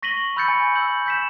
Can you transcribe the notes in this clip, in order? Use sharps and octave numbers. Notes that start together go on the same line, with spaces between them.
C#6 A#6 B6 D#7 F#7 G7
B5 E6 F#6 G6 A6 C#7
G#5
E6 G6 F#7
G6 B6 E7